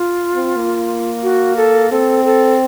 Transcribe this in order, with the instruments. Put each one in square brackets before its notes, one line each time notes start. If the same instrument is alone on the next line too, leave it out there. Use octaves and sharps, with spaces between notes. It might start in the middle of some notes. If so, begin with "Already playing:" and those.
Already playing: [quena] F4
[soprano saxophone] C4
A#3
[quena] F#4
A4
[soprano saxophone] C4 [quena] A4
[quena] A4